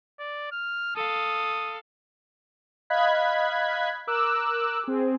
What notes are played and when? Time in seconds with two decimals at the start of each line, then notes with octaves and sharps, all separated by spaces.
0.19 D5
0.51 F6
0.96 A4 F5 D#6
2.90 D#5 F5 B5 F#6 G#6 B6
4.07 A#4 D6 E6 F#6
4.84 C4 G#4